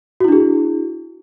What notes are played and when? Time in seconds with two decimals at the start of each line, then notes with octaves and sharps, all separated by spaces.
0.20 F#4
0.24 E4
0.28 D4
0.32 G#4